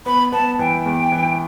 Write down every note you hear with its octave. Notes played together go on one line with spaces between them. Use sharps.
B3 B5
B3 A5
E3 G5
E2
E3